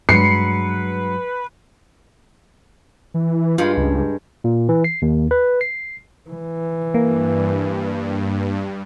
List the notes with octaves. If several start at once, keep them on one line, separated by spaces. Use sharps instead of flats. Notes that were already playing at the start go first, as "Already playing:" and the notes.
G2 F#3 G#3 D4 B4 C7 C#7
E3
G2 G#3 F4 B5
C#2
A#2
E3
C7
D#2
B4
C7
E3
G2 A#3